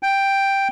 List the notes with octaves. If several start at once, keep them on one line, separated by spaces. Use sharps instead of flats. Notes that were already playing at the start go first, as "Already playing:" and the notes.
G5